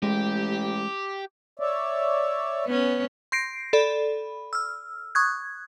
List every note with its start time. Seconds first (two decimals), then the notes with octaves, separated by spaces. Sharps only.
0.03 A1 G#3 G4
1.60 C#5 D5 E5
2.65 B3 C#4
3.32 C6 G6 A#6 C7 D7
3.73 A4 D5 B5
4.53 E6 F6
5.15 C#6 D#6 F#6 G#6